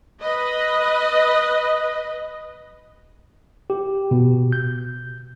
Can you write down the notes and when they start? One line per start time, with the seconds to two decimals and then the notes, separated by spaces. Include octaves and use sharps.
0.22 B4 D#5
3.70 G4
4.11 B2
4.52 G6